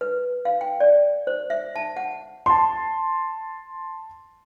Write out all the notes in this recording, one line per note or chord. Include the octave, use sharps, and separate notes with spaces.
B4
F5
G5
D5
C5
E5
A5
F#5
A5 C6